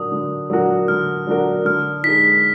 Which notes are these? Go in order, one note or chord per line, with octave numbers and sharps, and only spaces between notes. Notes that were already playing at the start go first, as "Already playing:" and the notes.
Already playing: D3 F#3 D4 F#4 A#4 D#6
D3
F#3 D4 F#4 A#4
D3 F6
F#3 D4 F#4 A#4
D3 F6
G#3 D#4 B6